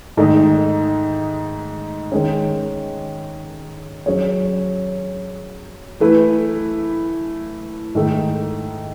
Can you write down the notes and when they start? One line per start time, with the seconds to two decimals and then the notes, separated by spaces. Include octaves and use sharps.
0.17 G#2 D#3 A3 D#4
2.12 D#3 G#3 C#4
4.06 F#3 C#4 G#4 C#5
6.00 E3 A3 E4 B4
7.95 G#2 D#3 A3